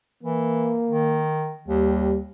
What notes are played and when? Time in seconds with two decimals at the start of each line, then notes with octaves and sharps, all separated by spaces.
0.23 E3 A#3
0.89 D#3
1.68 D#2 G3